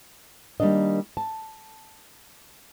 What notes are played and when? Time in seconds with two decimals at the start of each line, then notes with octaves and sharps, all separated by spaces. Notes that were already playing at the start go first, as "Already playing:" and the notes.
0.60 D#3 G3 A3 A#3 D4 D#5
1.17 A5